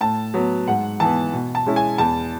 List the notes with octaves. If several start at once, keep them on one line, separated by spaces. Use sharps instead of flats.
A2 A5
F#3 B3
G#2 F#5
E3 B3 A5
B2
A5
G#3 C#4 E4
G#5
E2 A5